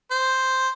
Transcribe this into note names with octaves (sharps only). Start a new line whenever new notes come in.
C5